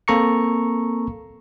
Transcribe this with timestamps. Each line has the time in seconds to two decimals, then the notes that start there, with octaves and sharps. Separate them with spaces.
0.08 A#3 C4 A4 A#5 C#6 C#7